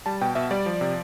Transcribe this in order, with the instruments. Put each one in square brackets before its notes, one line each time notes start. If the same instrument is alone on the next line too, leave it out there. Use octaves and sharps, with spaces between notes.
[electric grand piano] G3 A5
B2 G5
B2 E5
G3 D5
F3
C3